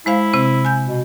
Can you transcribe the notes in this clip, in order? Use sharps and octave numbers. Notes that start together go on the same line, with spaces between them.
G#3 E4 C5 F5
C3 C4 C5
G#5 G6
B2